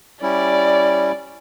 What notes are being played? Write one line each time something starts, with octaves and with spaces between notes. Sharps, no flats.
G3 C#4 E4 D5